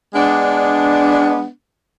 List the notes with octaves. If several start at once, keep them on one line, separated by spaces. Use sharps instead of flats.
G#3 B3 D4